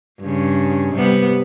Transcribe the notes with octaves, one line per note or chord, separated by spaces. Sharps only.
G2 C#3
C3 G3 B3